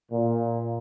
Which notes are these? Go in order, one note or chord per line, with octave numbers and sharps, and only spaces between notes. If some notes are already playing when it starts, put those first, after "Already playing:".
A#2